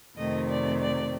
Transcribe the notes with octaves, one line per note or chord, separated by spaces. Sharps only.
F2 C3 D#3 A3 C4 D#5
D5
D5